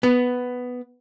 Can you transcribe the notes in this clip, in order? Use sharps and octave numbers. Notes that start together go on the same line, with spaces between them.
B3